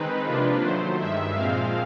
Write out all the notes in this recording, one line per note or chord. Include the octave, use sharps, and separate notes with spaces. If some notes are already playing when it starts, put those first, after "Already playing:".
Already playing: D#3 G#3 C4 D#4 B4
C3 F3 A#3 D4 F4
D#3 F#3 A3 C5
G2 D#3 G#3 E5
A#2 F3 G#3 C4 F5